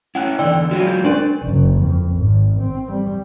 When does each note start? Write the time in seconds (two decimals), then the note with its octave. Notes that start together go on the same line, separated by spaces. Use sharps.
0.15 C#4 E4 F#5 G5 F#6
0.39 E2 D3 D5 G5 E6
0.71 F#3 G#3 F4 F#4
0.87 G6
1.05 C#4 D4 A#4 D5
1.43 F#1
1.80 F2
2.17 G#1
2.60 C4
2.92 G3